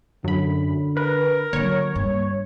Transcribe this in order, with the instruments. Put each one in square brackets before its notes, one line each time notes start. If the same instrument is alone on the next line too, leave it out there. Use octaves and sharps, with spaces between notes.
[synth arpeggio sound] F#2 B5 [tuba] D3
[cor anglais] A#4 [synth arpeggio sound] B4
[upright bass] D3 F#3 [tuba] A#3 [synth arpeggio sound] C#5
[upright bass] G2